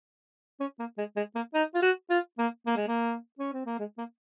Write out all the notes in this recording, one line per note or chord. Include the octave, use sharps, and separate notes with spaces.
C#4
A#3
G#3
G#3
A#3
D#4
F4
F#4
F4
A#3
A#3
G#3
A#3
C#4
C4
A#3
G#3
A#3